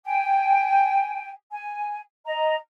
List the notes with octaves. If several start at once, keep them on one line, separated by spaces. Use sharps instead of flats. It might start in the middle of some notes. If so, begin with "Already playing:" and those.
G5 G#5
G#5
D#5 A#5